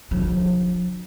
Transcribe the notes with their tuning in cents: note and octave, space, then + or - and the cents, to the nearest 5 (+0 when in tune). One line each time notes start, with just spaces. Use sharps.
D3 +15 F3 +40